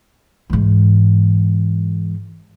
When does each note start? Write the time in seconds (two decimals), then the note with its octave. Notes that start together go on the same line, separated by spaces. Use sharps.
0.50 G#2 E3